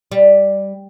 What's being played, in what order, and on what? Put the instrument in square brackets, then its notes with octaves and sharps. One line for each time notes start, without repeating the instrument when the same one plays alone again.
[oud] G3